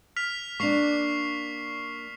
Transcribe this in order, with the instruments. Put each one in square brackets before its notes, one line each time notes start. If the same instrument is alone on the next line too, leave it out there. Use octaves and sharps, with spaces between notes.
[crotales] F6 B6 F7
[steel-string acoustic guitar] A#3 D4 [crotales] C#6 C7 F7